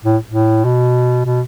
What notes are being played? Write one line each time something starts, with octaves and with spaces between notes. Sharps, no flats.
A2
A2
B2
B2